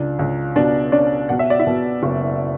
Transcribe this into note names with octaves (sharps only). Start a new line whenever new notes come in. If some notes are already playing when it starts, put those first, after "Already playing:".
Already playing: C#2 D4
C#2
B2 D4 D5
C#4 D4 D5
B2 F#5
E5
D5
E4 E5
B2
F#1